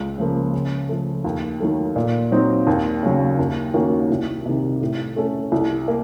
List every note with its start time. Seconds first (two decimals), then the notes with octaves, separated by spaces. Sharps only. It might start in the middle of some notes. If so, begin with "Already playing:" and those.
Already playing: C#2
0.18 C#3 F3 A#3
0.53 C#3
0.89 F3 A3
1.24 D#2
1.60 D#3 F#3 A3
1.96 A#2
2.32 F#3 C4 D#4
2.67 D#2
3.03 C#3 F#3
3.39 D#2
3.74 D#3 A#3 C#4 F#4
4.10 C2
4.46 C3 D#3
4.81 A2
5.16 A3 C#4 A4
5.52 C2
5.88 A#3